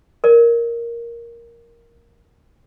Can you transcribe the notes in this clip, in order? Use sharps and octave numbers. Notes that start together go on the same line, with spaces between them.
A#4 D5